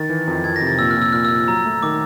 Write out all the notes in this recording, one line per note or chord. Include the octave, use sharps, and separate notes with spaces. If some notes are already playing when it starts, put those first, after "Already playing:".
Already playing: D#3 A6
E3
F2
F2 G#6
A#6
C3
A6
A#2 E6
F6
A#2
E6
A#2 F6
E6
A#2
F#3 A#5
A3
D#3 D6